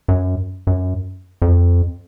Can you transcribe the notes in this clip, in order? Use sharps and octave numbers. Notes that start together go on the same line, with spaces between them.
F#2
F#2
F2